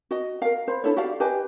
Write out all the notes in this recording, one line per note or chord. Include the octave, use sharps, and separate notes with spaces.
F#4 D#5
A#4 F5
C5 B5
D4 E4 A4 C#5
F#4 G4 D5 F5
G4 B4 D#5 G#5